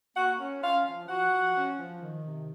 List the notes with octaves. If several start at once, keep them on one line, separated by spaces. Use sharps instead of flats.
A#3 F#4 F#5
C#4
C#4 F4 F5
F3
F3 F#4 F#5
F3
C#4
F3
D#3
C3